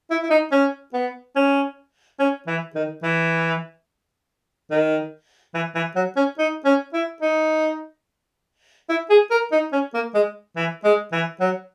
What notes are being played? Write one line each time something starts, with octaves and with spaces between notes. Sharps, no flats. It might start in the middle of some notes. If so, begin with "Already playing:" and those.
E4
E4
D#4
C#4
B3
C#4
C#4
E3
D#3
E3
D#3
E3
E3
F#3
C#4
D#4
C#4
E4
D#4
E4
G#4
A#4
D#4
C#4
A#3
G#3
E3
G#3
E3
F#3